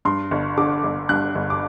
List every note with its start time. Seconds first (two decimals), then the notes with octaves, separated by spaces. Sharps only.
0.05 G2 C6
0.31 G1
0.57 D3 D6
0.84 G1
1.09 G2 F#6
1.35 G1
1.50 D6